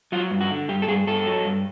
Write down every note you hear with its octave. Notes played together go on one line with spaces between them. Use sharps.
F#3 F4
G2
F#4
D3
G2 G4
A4
G2 G#4
G2 A4
F#3
G2